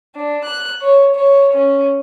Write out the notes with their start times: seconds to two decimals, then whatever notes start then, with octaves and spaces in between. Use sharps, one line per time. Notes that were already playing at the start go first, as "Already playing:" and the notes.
0.16 D4
0.46 F#6
0.83 C#5
1.16 C#5
1.53 C#4